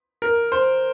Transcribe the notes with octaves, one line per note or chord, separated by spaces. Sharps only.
A#4
C5